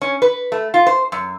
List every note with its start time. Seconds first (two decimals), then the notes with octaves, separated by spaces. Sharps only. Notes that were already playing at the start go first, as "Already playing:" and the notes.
0.02 C#4
0.22 B4
0.52 A3
0.74 F4
0.87 C5
1.12 F#2